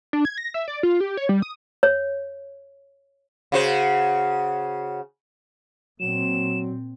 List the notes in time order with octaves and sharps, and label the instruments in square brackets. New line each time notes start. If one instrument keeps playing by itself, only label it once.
[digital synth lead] D4
G#6
A#6
E5
D5
F4
G4
C#5
G3
D#6
[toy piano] C#5
[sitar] C#3 F#4 C5
[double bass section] A#2 C4 [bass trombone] F#3 [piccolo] E7